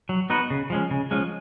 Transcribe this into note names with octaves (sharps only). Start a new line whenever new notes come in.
F#3
B3 D#4 F#4 B4
C#3
F3 G#3 C#4
C#3
F3 G#3 C#4